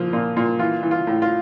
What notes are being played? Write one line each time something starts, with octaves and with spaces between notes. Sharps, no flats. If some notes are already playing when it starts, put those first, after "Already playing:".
Already playing: A#2 F3
A#2
A#2
E3 F4
E3
F4
A2
F4